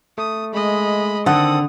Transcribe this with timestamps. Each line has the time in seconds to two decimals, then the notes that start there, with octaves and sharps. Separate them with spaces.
0.18 A3 D#6
0.54 G#3 D#5 B5
1.26 D3 D#3 C4 A4 F#5 D#6